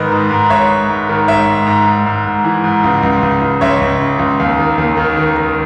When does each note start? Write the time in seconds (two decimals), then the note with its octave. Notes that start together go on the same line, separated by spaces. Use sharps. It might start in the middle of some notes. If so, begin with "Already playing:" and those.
Already playing: G#2 D#3 B4 D#5
0.12 G#2
0.31 G#2
0.50 G#2 C#5 E5
0.70 G#2
0.89 G#2
1.09 D#3
1.28 G#2 C#5 E5
1.47 G#2
1.67 G#2
1.87 G#2
2.06 G#2
2.26 G#2
2.44 E3
2.64 G#2
2.84 C#2
3.03 C#2
3.23 C#2
3.41 C#2
3.61 C#2 C#5 E5
3.81 C#2
4.00 C#3
4.19 C#2
4.39 D#2
4.59 D#3
4.78 D#2
4.97 D#3
5.17 D#3
5.36 D#3